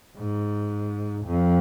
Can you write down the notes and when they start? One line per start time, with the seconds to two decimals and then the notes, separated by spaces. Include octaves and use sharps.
0.18 G#2
1.25 F2